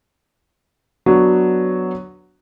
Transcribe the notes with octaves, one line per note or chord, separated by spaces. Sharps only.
F#3 B3 D4 F#4